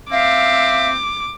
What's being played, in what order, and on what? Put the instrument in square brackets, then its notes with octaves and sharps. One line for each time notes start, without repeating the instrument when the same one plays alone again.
[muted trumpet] C4 [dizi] E5 [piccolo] F5 [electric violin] D6